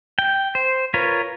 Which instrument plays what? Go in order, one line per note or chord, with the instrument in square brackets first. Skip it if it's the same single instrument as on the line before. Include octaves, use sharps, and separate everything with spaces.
[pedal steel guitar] G5
C5
F4 A#4 B4 C#5